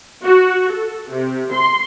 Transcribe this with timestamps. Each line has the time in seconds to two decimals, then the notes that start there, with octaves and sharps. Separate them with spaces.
0.25 F#4
0.71 A4
1.12 C3
1.52 C6